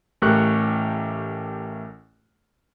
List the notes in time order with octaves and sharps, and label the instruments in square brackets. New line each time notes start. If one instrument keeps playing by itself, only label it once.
[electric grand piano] A1 A3 G4 A#4 C#6 F#6